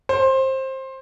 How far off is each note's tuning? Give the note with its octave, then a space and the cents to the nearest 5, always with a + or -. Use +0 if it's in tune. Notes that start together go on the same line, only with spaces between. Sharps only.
C5 +20